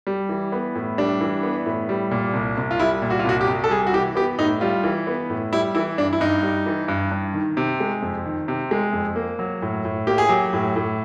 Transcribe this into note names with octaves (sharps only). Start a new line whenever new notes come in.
G3
E3
B3
A2
G3 D4
E3
B3
A2
G3
A#2
C2
C2
F4
G3 E4
A#2
F#4
F4
C2 F#4
G4
C2
A4
G3 G#4
F#4
E3 G4
B3 G4
A2 D#4
G3 F4
E3
B3
A2
G3 E4
E3 E4
G2 D4
E4
G2 D#4
G3
E3
G2
G2
D#3
C3
G#3
F2
D#3
C3
G#3
F2
A#3
F#3
A2
A2
A#3 G4
G#4
F#3 G4
A2
A2